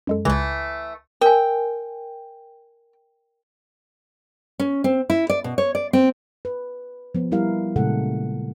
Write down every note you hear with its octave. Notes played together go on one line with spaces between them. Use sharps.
F#2 G#3 A4
C#2 C#3 E3 A3
A#4 G5 G#5
C#4
C4
E4
D5
B2
C#5
D5
C4
B4
F3 B3
F3 G3 E4 A#4 F5
A#2 C#3 G#3 A4 F#5